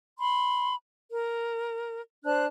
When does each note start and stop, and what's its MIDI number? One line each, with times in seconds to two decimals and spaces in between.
0.18 0.74 83
0.18 0.74 84
1.11 2.01 70
2.25 2.46 62
2.25 2.46 72
2.25 2.46 81
2.25 2.46 90